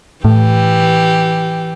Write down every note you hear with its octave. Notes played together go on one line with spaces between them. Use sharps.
A2 E3 G4